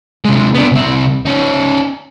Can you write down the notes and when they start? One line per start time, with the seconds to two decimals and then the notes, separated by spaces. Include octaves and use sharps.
0.25 C3 G#3
0.54 B3 D4
0.72 C2 C4
1.25 C#4 D#4